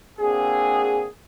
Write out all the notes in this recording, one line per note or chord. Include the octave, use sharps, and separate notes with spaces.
A#3 C4 D4 F#4 G#4